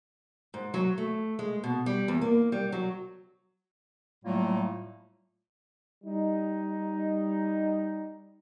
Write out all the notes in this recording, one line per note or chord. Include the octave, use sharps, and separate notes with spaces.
G#2
F#3
A3
G#3
B2
G3
E2
A#3
G3
F#3
A2 F#3 G3 A3 A#3 F4
G3 D#4